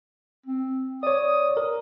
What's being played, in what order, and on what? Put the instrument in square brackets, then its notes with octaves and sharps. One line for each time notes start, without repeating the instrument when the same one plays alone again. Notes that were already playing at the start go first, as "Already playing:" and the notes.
[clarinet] C4
[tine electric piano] C#5 D5 [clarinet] D#6
[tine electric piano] A#4